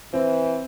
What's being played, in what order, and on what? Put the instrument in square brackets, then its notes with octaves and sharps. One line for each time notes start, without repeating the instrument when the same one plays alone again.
[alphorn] E3 [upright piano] C4